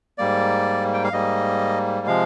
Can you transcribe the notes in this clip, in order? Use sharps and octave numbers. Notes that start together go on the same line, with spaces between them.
G#2 G3 A#3 D5
G5
F5
G#2 G3 A#3 D#5
C3 F3 G#3 F5